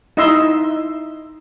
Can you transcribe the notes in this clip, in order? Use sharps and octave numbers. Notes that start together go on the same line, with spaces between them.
D#4 E4 D#5 E5 C6 E6